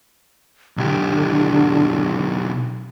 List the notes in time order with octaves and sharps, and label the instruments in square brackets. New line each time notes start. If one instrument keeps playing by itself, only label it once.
[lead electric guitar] B1 G4 [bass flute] D3